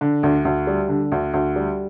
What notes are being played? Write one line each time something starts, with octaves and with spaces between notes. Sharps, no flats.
D3
D2
D2
G3
D3
D2
D2
G3